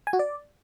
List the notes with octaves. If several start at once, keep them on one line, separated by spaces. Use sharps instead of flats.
G#5
F#4
D5